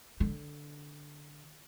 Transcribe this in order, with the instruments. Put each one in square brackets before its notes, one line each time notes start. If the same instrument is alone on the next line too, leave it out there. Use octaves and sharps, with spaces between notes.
[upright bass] D3